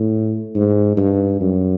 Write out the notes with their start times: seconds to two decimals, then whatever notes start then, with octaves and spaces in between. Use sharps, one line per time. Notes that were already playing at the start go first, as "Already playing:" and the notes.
Already playing: A2
0.56 G#2
0.97 G2
1.41 F#2